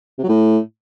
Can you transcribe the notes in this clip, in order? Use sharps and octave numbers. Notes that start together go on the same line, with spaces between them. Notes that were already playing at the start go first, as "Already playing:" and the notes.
C3
F#3
A2